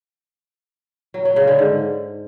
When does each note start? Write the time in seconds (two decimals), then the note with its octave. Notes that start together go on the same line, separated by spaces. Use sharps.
1.14 F#3
1.25 F#3
1.36 C#3
1.47 D3
1.59 G#2